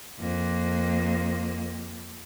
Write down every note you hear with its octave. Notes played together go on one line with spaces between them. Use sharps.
F2 A#3